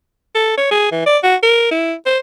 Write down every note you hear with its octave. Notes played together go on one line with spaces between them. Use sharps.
A4
C#5
G#4
E3
D5
F#4
A#4
E4
C5